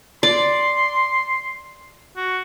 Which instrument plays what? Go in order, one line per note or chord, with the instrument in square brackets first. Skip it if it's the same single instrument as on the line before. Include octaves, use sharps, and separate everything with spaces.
[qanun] D5 [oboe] C6
[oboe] F#4